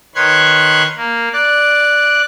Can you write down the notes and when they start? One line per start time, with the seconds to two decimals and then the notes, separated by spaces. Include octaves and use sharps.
0.15 D#3 B4 C#5 C6 F#6 G#6
0.97 A#3
1.33 D5 F#6